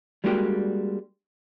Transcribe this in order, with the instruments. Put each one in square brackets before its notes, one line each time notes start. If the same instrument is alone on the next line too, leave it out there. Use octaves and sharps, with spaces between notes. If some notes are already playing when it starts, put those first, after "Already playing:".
[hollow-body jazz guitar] G3 G#3 A#3 D4 F#4 G4